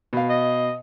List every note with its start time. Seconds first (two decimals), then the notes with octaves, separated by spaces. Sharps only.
0.13 B2 F5
0.29 D#5